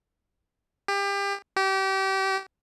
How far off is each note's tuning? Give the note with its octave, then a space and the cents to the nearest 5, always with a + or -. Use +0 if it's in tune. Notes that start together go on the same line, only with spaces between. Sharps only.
G4 +30
G4 -30